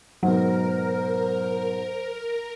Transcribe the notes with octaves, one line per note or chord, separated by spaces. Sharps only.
G#2 B2 F#3 A#4 C5